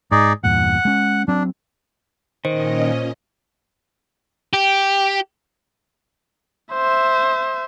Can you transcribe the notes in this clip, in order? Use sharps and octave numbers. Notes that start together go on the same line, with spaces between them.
G#2 D#4 G#4 D5
E2 G2 A#2 F#5
G#3 C#4
F#3 C4 D4
A#2 D#3 C#4 C5 D#5
G4
C5 E5